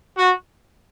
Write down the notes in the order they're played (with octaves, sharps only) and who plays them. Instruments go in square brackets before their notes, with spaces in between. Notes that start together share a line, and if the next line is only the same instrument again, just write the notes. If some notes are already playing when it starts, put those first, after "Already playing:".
[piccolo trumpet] F#4